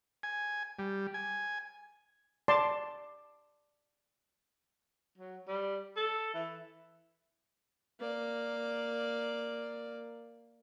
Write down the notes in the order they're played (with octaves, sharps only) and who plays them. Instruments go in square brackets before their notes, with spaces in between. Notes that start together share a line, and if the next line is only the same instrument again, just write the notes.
[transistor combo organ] G#5
G3
G#5
[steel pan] D5 A5 C6
[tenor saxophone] F#3
G3
A4
E3
[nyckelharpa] A#3 D5